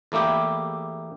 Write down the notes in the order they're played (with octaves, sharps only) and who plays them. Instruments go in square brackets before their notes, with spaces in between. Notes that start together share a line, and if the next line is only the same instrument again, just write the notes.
[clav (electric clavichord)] E2 A3 A#3 E4 G4